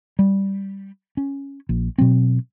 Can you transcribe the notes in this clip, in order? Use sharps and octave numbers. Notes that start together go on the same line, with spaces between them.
G3
C#4
A#1
B2 F#3 C4